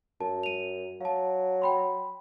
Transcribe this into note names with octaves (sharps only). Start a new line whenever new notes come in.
F#2 A5
D#7 F7
F#3 F5 A5
G5 B5 C6